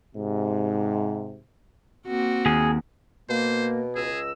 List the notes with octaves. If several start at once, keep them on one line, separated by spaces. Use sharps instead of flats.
G#2 C3
A#3 C4 F#4
D#2 G#4
B2 A#3 C5
C#2 G#4 D#5 E6